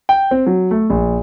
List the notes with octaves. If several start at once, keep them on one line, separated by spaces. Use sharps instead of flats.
G5
C4
F#3
A3
A#1